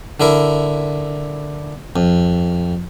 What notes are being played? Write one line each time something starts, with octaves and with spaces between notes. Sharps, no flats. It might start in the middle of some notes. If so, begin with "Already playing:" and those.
D3 E4 A#4
F2